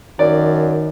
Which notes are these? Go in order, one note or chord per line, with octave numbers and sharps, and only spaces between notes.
F#2 D#3 D5